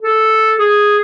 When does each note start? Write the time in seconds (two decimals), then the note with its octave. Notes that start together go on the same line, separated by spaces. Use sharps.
0.02 A4
0.59 G#4